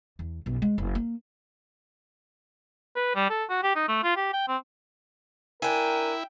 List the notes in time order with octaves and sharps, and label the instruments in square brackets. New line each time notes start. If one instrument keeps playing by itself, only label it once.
[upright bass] E2
B1 F#2
G#3
F#1
A#3
[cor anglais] B4
G3
A4
F#4
G4
D#4
A3
F4
G4
G5
C4
[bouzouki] D4 G#5 [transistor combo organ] E4 [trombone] A#4 [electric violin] G5